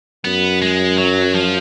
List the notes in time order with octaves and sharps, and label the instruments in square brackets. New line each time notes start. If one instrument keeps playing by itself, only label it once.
[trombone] F#2 [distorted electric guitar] B3
[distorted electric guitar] G#3
F#3
F3